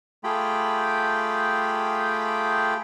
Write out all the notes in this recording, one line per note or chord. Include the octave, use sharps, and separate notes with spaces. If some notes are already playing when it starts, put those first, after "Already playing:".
A3 F4 G4 G#4 G5 B5